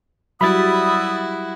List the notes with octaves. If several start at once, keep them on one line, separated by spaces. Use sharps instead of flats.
F#3 G3 E4 F#4 E5 B5 D#6 A6